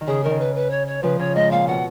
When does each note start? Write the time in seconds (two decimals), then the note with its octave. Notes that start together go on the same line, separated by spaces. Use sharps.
0.01 D#3
0.07 C#3 G#4
0.23 D#3 A#4
0.31 C#3
0.39 B4
0.55 B4
0.70 C#5
0.87 C#5
1.03 C#3 F3 B4
1.19 C#3 C#5
1.35 G#2 D#5
1.51 A#2 F5
1.67 B2 F#5